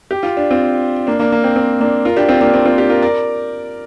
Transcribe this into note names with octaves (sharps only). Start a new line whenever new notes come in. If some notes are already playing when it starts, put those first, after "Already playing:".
G4
F4
D4
C4 F4
A#3 D4
A#3 D4
A#3
C4
C4
A#3 D4
F4 A#4
D4 G4
C4 F4
A#3 D4
C4
C4 F4
D4 G4
F4 A#4
A#4 D5